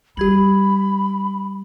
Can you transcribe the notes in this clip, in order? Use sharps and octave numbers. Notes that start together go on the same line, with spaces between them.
G3 G4 B5 G#6 F#7